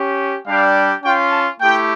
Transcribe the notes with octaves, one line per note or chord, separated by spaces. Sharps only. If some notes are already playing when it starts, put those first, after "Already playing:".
Already playing: C#4 G4
G3 D4 G4 F5
C#4 F4 G5
A5
A3 E4 G4 G5